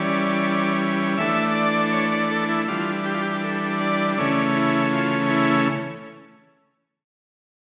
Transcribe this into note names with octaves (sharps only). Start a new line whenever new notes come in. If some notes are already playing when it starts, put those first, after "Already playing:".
Already playing: E3 G3 C#4 D5
E3 A3 D4 E5
D5
C#5
D5
A4
E4
E3 G3 D4 F4
G4
F4
G4
A4
D5
C#3 E3 A3 C#4 D5
E4
F4
E4